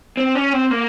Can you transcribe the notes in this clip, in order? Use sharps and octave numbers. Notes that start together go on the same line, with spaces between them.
C4
C#4
C4
A#3